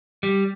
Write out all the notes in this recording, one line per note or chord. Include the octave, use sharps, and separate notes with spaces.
G3